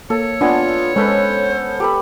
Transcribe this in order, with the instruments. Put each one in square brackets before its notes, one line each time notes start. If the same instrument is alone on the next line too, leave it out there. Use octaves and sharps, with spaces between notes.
[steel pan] A#3 [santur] A4 [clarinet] C#5
[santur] B3 [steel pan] D4 G#5 [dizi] F4
[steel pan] G#3 [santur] C#4 A4 B4 [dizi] C5
[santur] G4 A4 B5